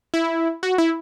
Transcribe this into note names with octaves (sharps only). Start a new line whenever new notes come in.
E4
F#4
E4